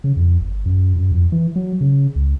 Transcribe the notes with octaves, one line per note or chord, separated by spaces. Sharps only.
C#3
F2
G1
F#2
F#2
F2
E3
F#3
C#3
C#2